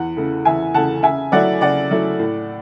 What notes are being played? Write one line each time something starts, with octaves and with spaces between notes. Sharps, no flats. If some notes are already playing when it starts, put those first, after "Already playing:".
Already playing: E2 F#5
C#3 E3 A3
E2 E5 G#5
C#3 E3 A3 F#5 A5
C#3 E5 G#5
F#3 A3 E4 D5 F#5
C#3 D5 F#5
F#3 A3 E4
A2